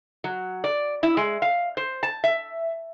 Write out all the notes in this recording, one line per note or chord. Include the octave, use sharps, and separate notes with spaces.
F#3
D5
E4
G#3
F5
C5
A5
E5